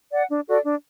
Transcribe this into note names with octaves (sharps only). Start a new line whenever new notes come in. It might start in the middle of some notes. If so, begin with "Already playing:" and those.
D5 F#5
D4
F#4 A4 D5
D4